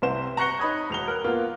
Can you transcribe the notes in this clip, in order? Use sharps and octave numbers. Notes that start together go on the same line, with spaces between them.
C2 C3 C4 C5 E7
A#5 C#6 F#6 A#6 C#7 G7
D#4 C#5 B5 D#6 G#6
E1 F7 G7
A#4 F6 F#6
A#3 B3 F4